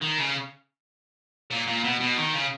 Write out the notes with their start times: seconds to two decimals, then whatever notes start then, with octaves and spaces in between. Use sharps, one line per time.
0.01 D#3
0.18 C#3
1.50 A#2
1.67 A#2
1.84 B2
2.00 B2
2.17 D#3
2.34 C#3